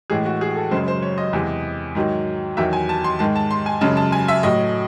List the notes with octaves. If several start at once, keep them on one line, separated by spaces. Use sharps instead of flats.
A2 E3 G#3 G#4
F#4
G#4
A4
F#2 C#3 G#3 C5
C5
C#5
D#5
E2 C3 E3 G#3
G#2 D#3 F#3
E2 D#3 F#3 E5
G#5
A5
C6
G#2 D#3 G#3 A5
A5
C6
G#5
F#2 C#3 G#3 A5
A5
G#5
E5
A2 F#3 D#5